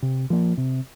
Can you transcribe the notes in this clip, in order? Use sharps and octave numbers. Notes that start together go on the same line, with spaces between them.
C3
F3 A#3
C3